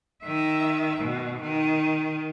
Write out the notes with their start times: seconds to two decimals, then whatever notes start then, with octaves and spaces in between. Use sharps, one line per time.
0.24 D#3 E5
1.00 B2
1.42 D#3